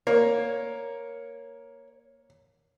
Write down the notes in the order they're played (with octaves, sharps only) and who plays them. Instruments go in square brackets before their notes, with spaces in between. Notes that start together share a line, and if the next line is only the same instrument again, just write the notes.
[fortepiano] A#3 [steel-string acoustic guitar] C#5